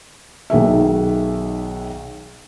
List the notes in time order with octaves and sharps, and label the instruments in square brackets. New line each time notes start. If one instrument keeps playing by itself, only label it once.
[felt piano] B1 D#3 G#4 E5